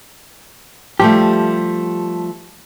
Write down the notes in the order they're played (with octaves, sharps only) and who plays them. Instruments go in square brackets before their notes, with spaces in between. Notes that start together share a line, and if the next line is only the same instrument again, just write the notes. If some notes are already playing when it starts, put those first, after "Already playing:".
[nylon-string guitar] F3 G3 A3 [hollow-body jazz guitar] G4